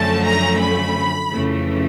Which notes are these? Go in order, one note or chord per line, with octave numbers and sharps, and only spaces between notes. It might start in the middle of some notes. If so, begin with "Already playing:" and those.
Already playing: F#2 D3 F3 A3 C#4 A5
A#5
B5
F2 C#3 E3 A3